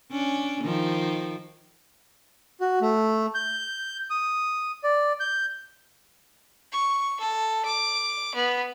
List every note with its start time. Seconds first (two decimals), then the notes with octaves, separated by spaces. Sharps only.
0.11 C#4 D4
0.64 D#3 F3
2.61 F#4
2.81 A3
3.34 G6
4.10 D#6
4.84 D5
5.20 G6
6.72 C#6
7.20 A4
7.65 D6
8.35 B3